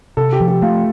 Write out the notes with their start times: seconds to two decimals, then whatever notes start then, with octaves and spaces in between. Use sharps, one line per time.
0.17 C3 A4
0.33 G4
0.40 F3
0.48 G4
0.62 A3 F4